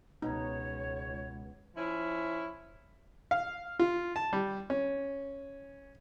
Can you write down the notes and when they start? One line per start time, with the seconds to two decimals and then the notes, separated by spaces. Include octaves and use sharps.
0.22 C#2 B2 D#4 C#5
1.76 F3 C#4 E4
3.31 F5
3.79 F4
4.16 A5
4.33 G3
4.70 C#4